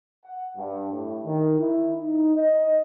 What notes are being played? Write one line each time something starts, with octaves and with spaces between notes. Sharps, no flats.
F#5
G2
A2
D#3
E4
D#4
D#5